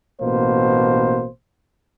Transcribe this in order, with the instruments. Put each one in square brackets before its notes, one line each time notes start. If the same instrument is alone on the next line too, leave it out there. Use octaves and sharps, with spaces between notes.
[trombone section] A1 B2 A#3 C5